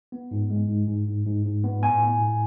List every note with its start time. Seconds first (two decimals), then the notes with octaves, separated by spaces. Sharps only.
0.12 B3
0.31 G#2
0.50 G#3
0.69 G#2
0.88 G#2
1.07 G#2
1.26 G#2
1.45 G#2
1.64 B3
1.83 A2 G#5
2.02 A2
2.21 A2